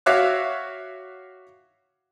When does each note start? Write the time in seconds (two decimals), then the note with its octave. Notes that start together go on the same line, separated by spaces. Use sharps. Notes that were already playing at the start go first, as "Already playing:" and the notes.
0.06 F#4 C#5 E5 F5 D6 F#6